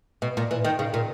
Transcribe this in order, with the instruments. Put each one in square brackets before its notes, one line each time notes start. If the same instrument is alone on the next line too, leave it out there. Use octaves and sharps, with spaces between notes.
[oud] B2
A#2
E3
D#3
C#3
A#2